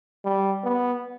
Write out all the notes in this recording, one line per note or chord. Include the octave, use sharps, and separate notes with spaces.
G3
B3